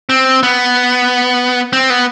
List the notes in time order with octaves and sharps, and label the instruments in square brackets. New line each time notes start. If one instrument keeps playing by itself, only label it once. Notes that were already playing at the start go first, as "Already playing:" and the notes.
[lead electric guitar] C4
B3
C4
B3